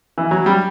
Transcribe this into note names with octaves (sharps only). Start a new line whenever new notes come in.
E3
F#3
G3